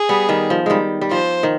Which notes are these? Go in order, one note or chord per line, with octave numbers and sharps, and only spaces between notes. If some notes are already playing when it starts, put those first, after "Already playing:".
Already playing: G#4
G3 B3
D#3 G3
F3
D#3 G3 G#3
G3
F3 C5
D#3